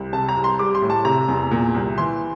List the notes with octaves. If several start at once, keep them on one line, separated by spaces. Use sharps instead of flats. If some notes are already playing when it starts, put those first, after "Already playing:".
Already playing: C2
C3 A5
A#5
C2
C6
G3 D6
C6
A2
A5
C3 A#5
E2
A#2
C2
E3 C6